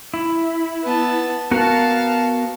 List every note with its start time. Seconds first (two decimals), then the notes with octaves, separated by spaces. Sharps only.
0.14 E4
0.84 B3 A5
1.51 B3 F#4 A#4 F5 A5